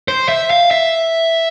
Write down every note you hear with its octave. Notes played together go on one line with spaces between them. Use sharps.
C5
E5
F5
E5